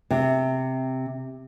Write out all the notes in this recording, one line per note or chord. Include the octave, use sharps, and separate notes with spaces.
C3